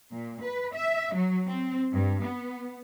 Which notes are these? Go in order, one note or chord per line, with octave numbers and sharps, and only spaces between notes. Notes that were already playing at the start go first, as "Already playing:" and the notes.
A#2
B4
E5
F#3
C4
G2
B3